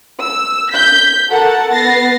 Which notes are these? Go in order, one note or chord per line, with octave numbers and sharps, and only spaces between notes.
E6
G6 B6
F#4 A4 A#4 F#5 A5
B3 A6 A#6 C7